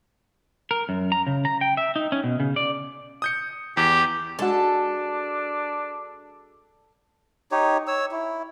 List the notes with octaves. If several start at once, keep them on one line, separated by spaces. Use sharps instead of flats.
A#4
F#2
A#5
C#3
A#5
G5
E5
D#4
C#4
B2
C#3
D5
D#6 G6 C#7
E2 G4
G#3 D4 F#4 A4
D#4 G4 C#5
C#5 E6
E4